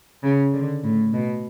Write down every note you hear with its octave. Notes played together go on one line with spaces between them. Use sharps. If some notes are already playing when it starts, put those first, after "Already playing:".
C#3
D3
A2
B2